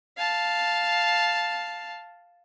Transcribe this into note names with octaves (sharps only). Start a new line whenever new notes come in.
F5 A5